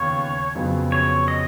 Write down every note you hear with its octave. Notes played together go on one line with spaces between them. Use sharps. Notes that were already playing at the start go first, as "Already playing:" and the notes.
Already playing: D#2 C#3 B3 F4 C#5
F2 C#3 F#3 B3
C#5
D#5